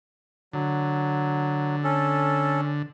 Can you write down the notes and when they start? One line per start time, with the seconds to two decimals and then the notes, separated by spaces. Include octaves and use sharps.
0.53 D3 F#3
1.84 C#4 A4